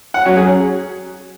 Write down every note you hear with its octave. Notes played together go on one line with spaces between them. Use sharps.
F#5
F#3 C#4
G#4